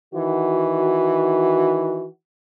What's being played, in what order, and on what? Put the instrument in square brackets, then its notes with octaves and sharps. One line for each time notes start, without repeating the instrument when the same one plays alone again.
[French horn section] D#3 E3 F#4